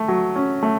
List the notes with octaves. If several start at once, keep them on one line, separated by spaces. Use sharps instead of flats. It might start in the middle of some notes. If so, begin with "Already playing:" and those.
Already playing: A3
F#3
C#4
A3